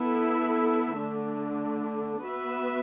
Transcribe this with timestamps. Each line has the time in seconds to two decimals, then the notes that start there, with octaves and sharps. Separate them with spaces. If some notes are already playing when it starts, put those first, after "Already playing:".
Already playing: B3 E4 A4 E5
1.00 D3 A3 D4
2.24 B3 F#4 B4 E5